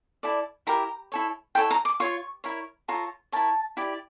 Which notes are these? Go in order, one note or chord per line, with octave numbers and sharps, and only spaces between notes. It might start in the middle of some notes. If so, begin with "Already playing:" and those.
E4 A4 D5
E4 G4 A#4 A#5
E4 A4 C#5
E4 A4 C#5 G5
A#5
D6
F4 C#5 C#6
E4 A#4 C#5
F4 A4 C#5 A#5
E4 A#4 C#5 A5
E4 G4 D5